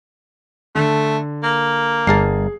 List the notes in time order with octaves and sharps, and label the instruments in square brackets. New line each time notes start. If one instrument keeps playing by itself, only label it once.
[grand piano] D3 [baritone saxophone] A3
[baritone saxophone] A#3
[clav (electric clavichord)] G1 A#4 A5 [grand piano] G#4 C7